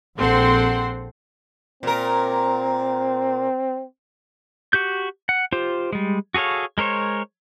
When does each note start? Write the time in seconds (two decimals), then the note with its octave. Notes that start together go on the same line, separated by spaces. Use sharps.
0.17 A#1 C4 A4 F#5 C6
1.83 A#2 C4 A#4
4.73 F#4 G4 G6
5.29 F#5
5.53 F4 G4 C5
5.93 G3 G#3
6.34 F#4 G#4 A4 C#5 F5
6.78 G#3 A#4 C5 C#5